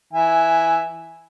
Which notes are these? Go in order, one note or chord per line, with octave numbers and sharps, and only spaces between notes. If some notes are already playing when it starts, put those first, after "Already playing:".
E3 E5 G#5